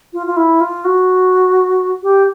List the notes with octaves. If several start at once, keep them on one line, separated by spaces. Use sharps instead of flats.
F4
F4
E4
F4
F#4
G4